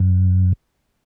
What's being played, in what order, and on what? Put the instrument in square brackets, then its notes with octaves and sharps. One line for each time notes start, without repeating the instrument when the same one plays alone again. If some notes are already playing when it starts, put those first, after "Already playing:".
Already playing: [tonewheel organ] F#2